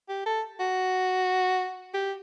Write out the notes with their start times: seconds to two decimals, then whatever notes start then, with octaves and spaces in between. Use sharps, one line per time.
0.09 G4
0.26 A4
0.60 F#4
1.94 G4